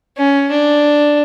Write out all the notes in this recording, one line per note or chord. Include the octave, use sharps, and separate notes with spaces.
C#4
D4